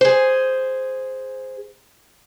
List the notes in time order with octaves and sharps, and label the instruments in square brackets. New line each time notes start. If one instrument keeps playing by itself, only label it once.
[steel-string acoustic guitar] G#4 C5